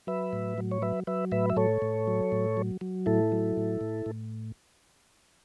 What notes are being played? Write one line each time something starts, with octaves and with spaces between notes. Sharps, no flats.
F#3 B4 E5
A2
F#3
C#5
F#3 B4 E5
F#3 B4 E5
A2 B4 E5
E5
A2 A4 C#5
A2
F#3
A2
F#3
F#3
A2 E4 A4
F#3
A2
A2
A2